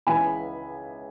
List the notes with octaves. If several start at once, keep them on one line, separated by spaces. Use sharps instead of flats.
C#2 C#3 E3 G#5 B5